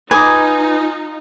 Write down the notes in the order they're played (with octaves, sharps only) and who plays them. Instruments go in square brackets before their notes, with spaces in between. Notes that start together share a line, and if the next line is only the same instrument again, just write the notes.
[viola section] D#4 F4 [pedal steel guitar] B4 D#6 [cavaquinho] G#5 D6